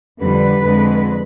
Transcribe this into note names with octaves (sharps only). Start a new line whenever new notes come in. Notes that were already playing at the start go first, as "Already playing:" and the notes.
F2 D3 G3 B4
F2 D3 G#3